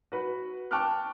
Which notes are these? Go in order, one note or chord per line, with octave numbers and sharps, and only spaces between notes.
F#4 B4
G5 A5 C#6 D6 F6 F#6